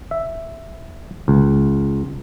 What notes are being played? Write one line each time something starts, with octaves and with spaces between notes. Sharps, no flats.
E5
C#2